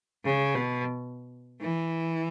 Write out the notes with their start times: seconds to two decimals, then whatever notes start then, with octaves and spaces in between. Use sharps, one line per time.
0.24 C#3
0.55 B2
1.61 E3